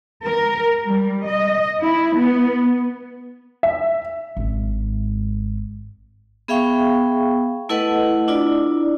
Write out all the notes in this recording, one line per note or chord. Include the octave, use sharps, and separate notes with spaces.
A#4
G3
D#5
E4
B3
E5
G#1 G#2
B3 G#4 E5 F5 G5 C#6
A3 E4 A4 B4 D#5 F#5
D4 E4 F4 D5